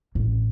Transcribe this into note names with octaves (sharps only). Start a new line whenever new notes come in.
A1